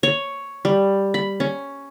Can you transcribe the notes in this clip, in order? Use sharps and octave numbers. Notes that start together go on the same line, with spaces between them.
C#5
G3
B5
C#4